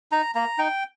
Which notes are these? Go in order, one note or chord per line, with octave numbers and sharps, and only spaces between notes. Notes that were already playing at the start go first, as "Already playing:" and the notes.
D#4 A#5
A#3 A#5
D#4 G5